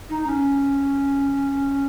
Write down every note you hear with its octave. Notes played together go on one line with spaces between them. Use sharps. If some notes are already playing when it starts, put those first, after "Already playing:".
D#4
C#4